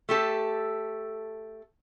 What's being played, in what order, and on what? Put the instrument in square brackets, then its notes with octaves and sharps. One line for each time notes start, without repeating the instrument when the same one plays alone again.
[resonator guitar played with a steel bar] A3 G4 A4